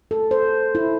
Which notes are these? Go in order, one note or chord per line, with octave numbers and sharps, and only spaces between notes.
A4
C5
E4